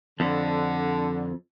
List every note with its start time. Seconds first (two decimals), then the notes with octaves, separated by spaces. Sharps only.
0.20 F2 D3